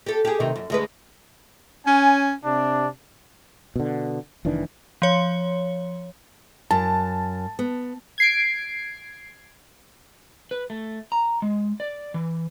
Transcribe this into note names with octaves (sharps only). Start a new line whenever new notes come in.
G4 A4
G4 G#4
D2 C3 D#3
F#2
D2 G#3 B4
C#4 G#5
C3 D4
B2 D3
F1 D#3 E3 D4
F3 C#5
F#2 A5
B3
G#6 C7 D7
B4
A3
A#5
G#3
D5
E3